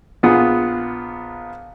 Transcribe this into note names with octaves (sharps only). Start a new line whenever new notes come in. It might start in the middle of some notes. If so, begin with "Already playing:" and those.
A#1 B3 F4 G#4 F#5 D#6